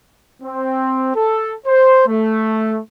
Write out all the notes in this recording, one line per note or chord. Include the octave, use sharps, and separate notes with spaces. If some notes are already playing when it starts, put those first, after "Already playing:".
C4
A4
C5
A3